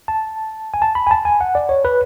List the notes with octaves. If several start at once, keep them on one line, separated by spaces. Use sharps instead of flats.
A5
G#5
A5
B5
G#5
A5
G#5
F#5
D5
C#5
B4